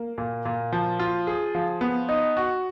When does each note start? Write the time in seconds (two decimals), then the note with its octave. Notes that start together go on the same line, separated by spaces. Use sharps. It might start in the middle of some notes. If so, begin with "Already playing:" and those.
Already playing: A#3
0.18 A#2
0.45 A#2
0.72 F3
0.99 F4
1.27 G#4
1.55 F3
1.81 B3
2.09 D#4
2.37 F#4